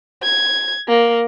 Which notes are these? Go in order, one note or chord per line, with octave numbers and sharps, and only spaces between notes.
G#6
A#3